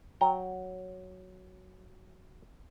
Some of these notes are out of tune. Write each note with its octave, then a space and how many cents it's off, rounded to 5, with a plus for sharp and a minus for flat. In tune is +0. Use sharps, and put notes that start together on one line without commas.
F#3 +0 G5 +0 A#5 +0